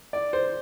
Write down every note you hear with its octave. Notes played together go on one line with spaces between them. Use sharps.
D5
C5